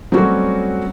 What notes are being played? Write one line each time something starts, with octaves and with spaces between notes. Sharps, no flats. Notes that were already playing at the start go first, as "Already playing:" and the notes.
F#3 G3 A3 C4 C#4 F#4